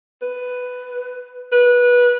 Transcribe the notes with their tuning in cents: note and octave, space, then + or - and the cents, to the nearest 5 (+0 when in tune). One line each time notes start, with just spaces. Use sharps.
B4 +10
B4 -20